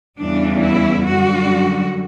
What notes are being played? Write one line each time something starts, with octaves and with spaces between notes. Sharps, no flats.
E2 C#3 E3 G3 D4
E4
F#2 D3 G3 F#4